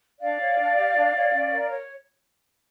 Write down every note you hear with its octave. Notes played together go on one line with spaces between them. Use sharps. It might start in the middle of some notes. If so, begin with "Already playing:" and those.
D4 D5 F5
C#5
D4
G4
D4
C#5
C#4
A#4
C#5